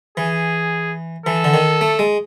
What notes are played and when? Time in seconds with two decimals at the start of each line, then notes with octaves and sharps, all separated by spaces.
0.17 E3 G#4
1.26 E3 A4
1.44 D3
1.54 D#3
1.81 A3
1.99 G#3